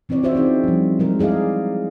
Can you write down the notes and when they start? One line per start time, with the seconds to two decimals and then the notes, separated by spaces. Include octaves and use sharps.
0.09 E3 C4 E4 C#5 D5
0.23 D4 F4 F#4 C5 D5 E5
0.35 C4 C#4 D#4 E4 G#4
0.64 F3 G3
0.99 F#3 G#3 A#4
1.19 E4 G#4 D5 D#5 F5